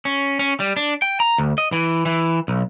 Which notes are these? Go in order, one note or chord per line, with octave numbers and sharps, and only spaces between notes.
C#4
C#4
G3
D4
G5
A#5
D2
D#5
E3
E3
B1